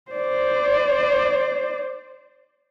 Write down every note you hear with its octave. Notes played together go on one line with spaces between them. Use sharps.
C5 D5